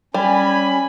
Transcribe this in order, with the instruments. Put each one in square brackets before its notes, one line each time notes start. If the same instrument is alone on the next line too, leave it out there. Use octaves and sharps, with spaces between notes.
[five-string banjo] G3 [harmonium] C#4 [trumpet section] G#5 B5